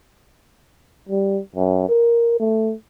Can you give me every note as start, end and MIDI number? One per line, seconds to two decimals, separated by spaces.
1.09 1.40 55
1.56 1.84 42
1.89 2.37 70
2.40 2.73 57